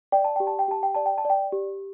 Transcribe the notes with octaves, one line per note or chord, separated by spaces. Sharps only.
D5 G5
A5
G4 G5
A5
G5
G4 A5
G5
D5 A5
G5
A5
D5 G5
G4